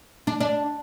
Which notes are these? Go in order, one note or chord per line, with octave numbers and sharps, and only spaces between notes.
D4
D4